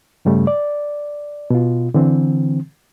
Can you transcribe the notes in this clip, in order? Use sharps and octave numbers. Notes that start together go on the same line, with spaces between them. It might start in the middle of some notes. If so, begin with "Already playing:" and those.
G2 C#3 G3 A3
D5
B2 F4
D3 E3 C4